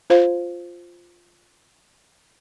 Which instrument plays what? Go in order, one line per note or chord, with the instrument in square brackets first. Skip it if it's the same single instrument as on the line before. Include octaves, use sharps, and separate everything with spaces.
[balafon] F4 C5 F5